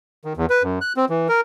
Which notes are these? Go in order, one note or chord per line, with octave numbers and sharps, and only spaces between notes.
D#3
E2
B4
F#2
F#6
C4
E3
A#4